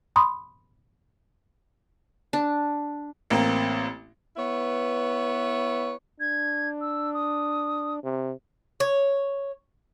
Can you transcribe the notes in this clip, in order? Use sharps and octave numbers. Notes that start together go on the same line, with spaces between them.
B5 C6 D#6
D4
A1 A#3 C4
B3 E4 B4 C#5
D4 G#6
E6
D#6
C3
C#5